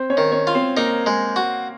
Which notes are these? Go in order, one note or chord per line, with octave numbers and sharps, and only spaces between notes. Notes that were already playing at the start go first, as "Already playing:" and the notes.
Already playing: C4 C5
C#4 C#5
D#3
C#4 C#5
F4
C4 C5
A#3 D#4 A#4
G#3
F#4